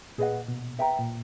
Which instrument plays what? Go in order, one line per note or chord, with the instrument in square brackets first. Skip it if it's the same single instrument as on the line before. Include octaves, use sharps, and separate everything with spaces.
[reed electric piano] A#2 [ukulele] G#4 B4 D#5 F#5
[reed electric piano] B2
[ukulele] B4 E5 G5 A#5
[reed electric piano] A#2